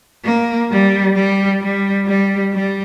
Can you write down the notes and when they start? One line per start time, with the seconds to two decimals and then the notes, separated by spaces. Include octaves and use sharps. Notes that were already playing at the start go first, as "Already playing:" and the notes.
0.25 A#3
0.70 G3
1.16 G3
1.61 G3
2.07 G3
2.53 G3